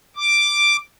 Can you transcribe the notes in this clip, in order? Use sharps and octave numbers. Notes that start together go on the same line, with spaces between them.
D6